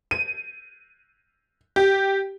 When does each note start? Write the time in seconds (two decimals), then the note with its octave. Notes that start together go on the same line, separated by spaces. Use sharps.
0.11 D#7
1.76 G4